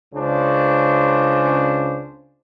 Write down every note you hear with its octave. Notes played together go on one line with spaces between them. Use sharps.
C#2 C#3 D4 C5